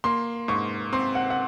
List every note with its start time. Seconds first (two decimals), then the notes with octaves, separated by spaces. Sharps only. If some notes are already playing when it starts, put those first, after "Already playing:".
0.04 A#3 C6
0.48 G#2 C#6
0.93 C4 C6
1.15 F#5
1.30 F#5